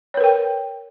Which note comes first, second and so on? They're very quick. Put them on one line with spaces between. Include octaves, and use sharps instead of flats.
C#5 B4 A#4 G5